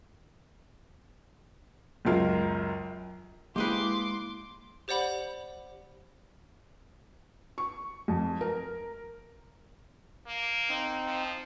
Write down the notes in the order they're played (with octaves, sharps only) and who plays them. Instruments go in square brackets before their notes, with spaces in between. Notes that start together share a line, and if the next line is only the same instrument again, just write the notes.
[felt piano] C#2 F#2 F4 A#4
[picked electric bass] G#3 A#3 [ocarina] E4 [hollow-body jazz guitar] G4 G#4 B4 [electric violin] C6 D6
[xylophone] G4 C5 D5 F#5 B5 F#7
[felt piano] C#6
F2
A#4
[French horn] A#3
[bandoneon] C4 D#4
[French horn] F3